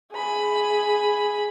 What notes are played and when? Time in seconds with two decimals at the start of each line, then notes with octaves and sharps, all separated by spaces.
0.13 G#4 B5